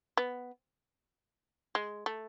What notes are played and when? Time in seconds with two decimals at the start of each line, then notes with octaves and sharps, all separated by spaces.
0.17 B3
1.75 G#3
2.06 A3